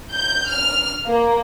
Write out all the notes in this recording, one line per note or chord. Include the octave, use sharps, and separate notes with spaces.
G6
F6
A#3